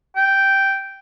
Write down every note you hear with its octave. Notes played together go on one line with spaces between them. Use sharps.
G5